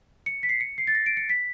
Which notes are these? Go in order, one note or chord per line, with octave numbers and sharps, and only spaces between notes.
C#7
B6
C7
C#7
C7
A6
A#6
D7
C#7
B6